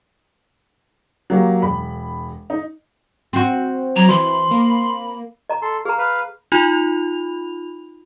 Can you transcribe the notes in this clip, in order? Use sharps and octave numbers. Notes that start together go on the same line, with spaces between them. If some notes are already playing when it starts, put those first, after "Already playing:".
F#3 A#3 G4
E1 B5
D#4
C4 F#4
F#3 A#5 G#6
E3 B5 C6
A#3
D#5 A#5
A4 C6
G#4 F5 A#5
B4 F5
D#4 F4 B5 F7